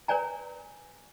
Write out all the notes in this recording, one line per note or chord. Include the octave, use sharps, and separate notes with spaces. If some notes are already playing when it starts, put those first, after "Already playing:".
A#4 B4 C#5 D5 G#5 A#5